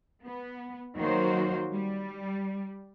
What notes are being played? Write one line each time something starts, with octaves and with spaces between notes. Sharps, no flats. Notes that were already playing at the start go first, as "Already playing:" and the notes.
B3
D#3 F#3 A#3 F#4 C5
G3